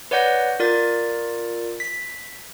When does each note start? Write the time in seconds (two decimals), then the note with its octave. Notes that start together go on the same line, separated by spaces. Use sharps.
0.11 B4 C#5 D5 F#5 G6 A#6
0.60 F4 A#4 D5 A6
1.80 B6